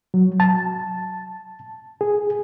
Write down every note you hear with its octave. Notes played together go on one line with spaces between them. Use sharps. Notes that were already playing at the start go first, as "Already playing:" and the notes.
F#3
A5
G#4